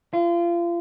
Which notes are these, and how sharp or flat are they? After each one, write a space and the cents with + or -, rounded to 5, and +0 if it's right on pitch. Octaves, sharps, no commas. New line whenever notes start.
F4 -30